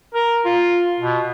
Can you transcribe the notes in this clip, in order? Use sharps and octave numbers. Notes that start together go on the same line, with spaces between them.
A#4
F4
B2